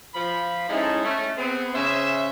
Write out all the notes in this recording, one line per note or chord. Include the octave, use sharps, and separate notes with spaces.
F3 B5
G#3 C#4 D#4 E4 A4
A3 C#4
B3 C4 G#4
C#3 C#4 C5 E5